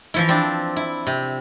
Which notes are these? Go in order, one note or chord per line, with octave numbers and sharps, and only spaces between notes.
E3 F3 E4
C4 D4
E4
C3